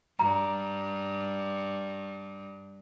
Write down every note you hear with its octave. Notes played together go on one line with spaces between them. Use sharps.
G2 A#5